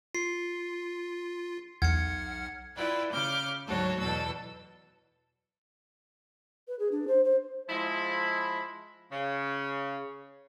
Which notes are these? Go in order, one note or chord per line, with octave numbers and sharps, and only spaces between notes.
F4 C7
B1 E2 F#5 F6 G#6 C#7
E4 F4 B4 D5 G5
C#3 D6 F6 G6
D2 G#2 F#3 F#4 A4 C#5
E2 B2 A4 E6
B4
G#4
D4
C5
C5
F3 G#3 E4
C#3